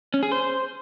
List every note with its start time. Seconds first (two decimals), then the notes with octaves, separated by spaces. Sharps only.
0.14 C#4
0.23 G#4
0.32 C5